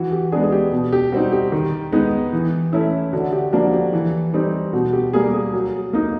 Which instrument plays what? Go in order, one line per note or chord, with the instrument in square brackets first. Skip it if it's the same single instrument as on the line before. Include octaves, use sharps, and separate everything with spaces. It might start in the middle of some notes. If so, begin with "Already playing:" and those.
Already playing: [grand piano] E3 F#4
G4
G#3 B3 D4 G#4
G#4
G4
B2
G4
G3 C4 D#4 F#4
G4
D#3
G#3 B3 D#4
E3
A3 C#4 E4
D3 F#4
G4
F3 A#3 D4 F#4
G4
E3
G3 C4 D#4
B2 F#4
G4
G3 A#3 G#4
G#4
F#3
A#3 D#4